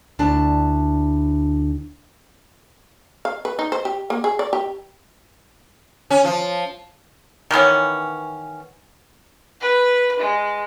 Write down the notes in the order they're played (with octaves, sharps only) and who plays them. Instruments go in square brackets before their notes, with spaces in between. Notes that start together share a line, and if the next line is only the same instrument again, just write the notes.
[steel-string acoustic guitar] D2 D4 E4 A5
[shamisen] F5
B4
D#4
C5
G4
A#3
G#4
D5
G4
[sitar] C#4
F3
[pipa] D#3 E3 B3 C#4
[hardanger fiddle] B4
G#3